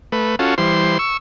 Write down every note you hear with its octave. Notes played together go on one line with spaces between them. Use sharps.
A3 B4
C#4 F4 F#4 A4
E3 G3 C5 C6
C#6 E6